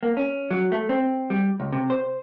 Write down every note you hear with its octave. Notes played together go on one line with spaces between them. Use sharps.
A#3
C#4
F#3
A3
C4
G3
C#2
C3
C5